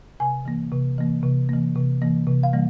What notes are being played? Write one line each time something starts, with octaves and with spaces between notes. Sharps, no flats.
C3 G#5
E3 A#3
C3
E3 A#3
C3
E3 A#3
C3
E3 A#3
C3
F5
E3 G3 A#3